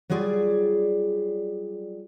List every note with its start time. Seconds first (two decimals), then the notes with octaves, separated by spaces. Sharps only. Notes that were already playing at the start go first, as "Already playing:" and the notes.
0.10 F#3 G3 F4 G#4 D5